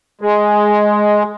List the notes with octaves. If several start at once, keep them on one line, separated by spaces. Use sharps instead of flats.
G#3